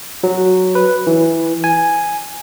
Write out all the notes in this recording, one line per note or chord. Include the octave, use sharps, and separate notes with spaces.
F#3
B4
E3
G#5